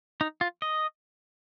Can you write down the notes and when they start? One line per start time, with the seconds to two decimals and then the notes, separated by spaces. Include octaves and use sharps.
0.21 D#4
0.41 F4
0.62 D#5